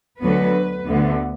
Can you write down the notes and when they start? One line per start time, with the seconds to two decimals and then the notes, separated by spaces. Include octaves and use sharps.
0.22 D2 D3 F#3 B3 B4
0.86 D2 D3 B3